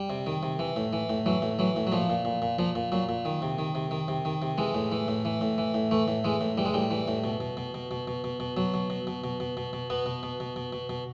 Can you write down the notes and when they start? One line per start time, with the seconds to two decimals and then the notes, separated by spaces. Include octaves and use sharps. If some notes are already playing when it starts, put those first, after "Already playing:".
Already playing: G3
0.10 C3
0.27 D#3
0.43 C3
0.59 E3
0.76 A2
0.93 E3
1.09 A2
1.26 E3 F#3
1.42 A2
1.59 E3 F#3
1.76 A2
1.87 F#3
1.92 A#2 F3
2.10 A#2
2.25 A#2
2.42 A#2
2.59 A#2 F3
2.75 A#2
2.92 A#2 F#3
3.09 A#2
3.25 D#3
3.42 C3
3.59 D#3
3.75 C3
3.91 D#3
4.08 C3
4.25 D#3
4.42 C3
4.58 E3 G#3
4.75 A2
4.92 E3
5.08 A2
5.25 E3
5.41 A2
5.58 E3
5.74 A2
5.91 E3 A3
6.08 A2
6.24 E3 G#3
6.41 A2
6.57 E3 G3
6.65 G#3
6.74 A2 G3
6.91 E3
7.08 A2
7.24 B2
7.40 B2
7.57 B2
7.74 B2
7.91 B2
8.07 B2
8.24 B2
8.40 B2
8.57 B2 F#3
8.74 B2
8.90 B2
9.07 B2
9.24 B2
9.40 B2
9.57 B2
9.73 B2
9.90 B2 B3
10.06 B2
10.23 B2
10.40 B2
10.56 B2
10.73 B2
10.89 B2